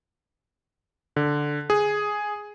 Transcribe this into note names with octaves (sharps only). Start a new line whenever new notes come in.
D3
G#4